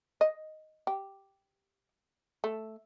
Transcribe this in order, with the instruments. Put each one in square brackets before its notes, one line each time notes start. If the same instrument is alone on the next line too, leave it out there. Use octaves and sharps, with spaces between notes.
[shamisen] D#5
G4
A3